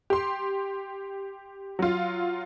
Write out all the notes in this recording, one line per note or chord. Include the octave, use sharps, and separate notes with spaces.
G4 C6
F#3 F4